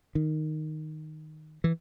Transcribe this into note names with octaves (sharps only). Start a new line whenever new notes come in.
D#3
E3